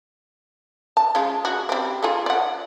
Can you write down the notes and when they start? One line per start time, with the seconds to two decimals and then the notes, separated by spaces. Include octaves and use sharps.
0.97 A5
1.15 C#3 G#3 F4
1.45 F#4 G#4
1.69 G3 C4
2.03 F4 G#4 A4
2.26 D5 F#5